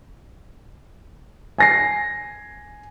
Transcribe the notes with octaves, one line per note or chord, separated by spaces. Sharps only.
G#5 A#6 C7